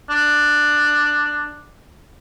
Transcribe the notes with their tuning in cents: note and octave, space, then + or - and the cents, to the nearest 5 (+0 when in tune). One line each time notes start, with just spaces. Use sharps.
D4 +10